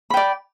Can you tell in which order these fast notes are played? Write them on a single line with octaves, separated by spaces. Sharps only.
B5 G5 D5